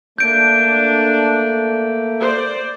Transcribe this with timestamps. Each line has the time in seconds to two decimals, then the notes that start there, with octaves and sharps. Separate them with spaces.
0.18 A3 A#3 D4 G6 D7
2.22 C5 D5